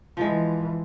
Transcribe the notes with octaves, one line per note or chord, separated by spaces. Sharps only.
E3 F3 G#3